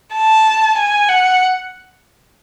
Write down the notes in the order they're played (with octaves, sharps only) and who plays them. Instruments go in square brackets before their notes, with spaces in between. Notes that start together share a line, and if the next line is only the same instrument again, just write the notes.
[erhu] A5
G#5
F#5